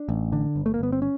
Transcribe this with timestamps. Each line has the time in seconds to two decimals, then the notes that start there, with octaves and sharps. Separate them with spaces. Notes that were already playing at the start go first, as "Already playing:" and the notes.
Already playing: D4
0.09 A1
0.32 D3
0.56 G1
0.66 A3
0.74 A#3
0.79 G1 B3
0.92 C4
1.02 C#4